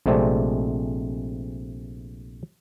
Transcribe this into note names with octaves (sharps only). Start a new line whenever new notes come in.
A#1 C3 G#3 A3 C4 D5